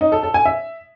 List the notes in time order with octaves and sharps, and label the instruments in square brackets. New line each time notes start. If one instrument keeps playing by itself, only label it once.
[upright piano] D#4
A4
A4
G#5
E5